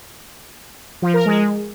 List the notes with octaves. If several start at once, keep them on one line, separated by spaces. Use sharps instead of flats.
F3
A#4
G#3